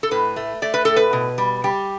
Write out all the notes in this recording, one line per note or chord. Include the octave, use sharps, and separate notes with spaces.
A4
A2 B4
A3
A3 D5
B4
A2 A4
B4
B2
G3
G3 G4